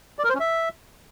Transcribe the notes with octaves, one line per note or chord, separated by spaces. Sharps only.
D5
A#4
C5
C#4
E5